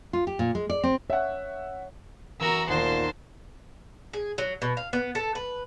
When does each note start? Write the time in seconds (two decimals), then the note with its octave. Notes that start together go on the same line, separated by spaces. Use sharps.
0.13 F4
0.27 G4
0.39 A#2
0.55 G#3
0.70 D5
0.83 C4
1.10 C#5 E5 F#5
2.40 E3 B3 C#4 F#4 A#4 A#5 E6
2.69 D#2 A#2 A#4 C5 F#5 A5 C6
4.13 G#4
4.38 F#3
4.62 B2
4.77 F5
4.93 B3
5.15 A4
5.35 B4